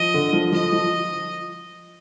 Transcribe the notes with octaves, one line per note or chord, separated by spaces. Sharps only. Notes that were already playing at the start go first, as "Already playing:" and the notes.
Already playing: F3 D#5
D3
F3
F3 D#5
F3